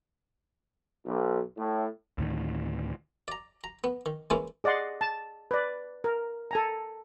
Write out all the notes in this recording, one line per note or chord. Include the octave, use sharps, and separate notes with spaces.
B1
A2
D2 A2 D#3
D5 A#5
A#5
B3
D#3
E3 G#3 A#3 C#4 E4 F4
G#4 D5 D#5 F#5 C6
A5
B4 D5
A#4
A4 G#5 A#5